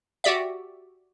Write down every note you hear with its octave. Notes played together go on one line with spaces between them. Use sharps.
F#4 G4 D5 E5